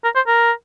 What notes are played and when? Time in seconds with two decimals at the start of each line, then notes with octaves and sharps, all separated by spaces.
0.04 A#4
0.16 C5
0.27 A#4